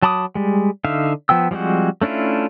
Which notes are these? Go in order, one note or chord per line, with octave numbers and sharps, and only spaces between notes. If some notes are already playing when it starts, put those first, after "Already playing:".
F#3 A5 B5 D6 D#6
G3 G#3
D3 D#4 E5 F5
F3 B3 G5 E6
F3 G3 G#3 C4 F#4
A3 C#4 D4 E4 F4